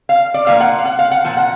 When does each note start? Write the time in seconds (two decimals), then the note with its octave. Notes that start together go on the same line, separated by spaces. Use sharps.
0.09 F5
0.34 D5
0.47 A#2 F3 A#3 D4 F5
0.60 F#5
0.78 F5
0.85 F#5
0.99 F5
1.11 F#5
1.24 A#2 F3
1.37 F#5